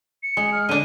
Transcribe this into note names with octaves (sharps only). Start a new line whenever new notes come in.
C#7
G#3
F6
D3 D4 D#7